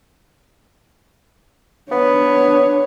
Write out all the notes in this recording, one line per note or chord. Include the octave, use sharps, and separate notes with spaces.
B3 D4 C#5